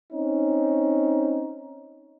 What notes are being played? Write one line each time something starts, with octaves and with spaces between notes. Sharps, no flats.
C4 C#4 D#4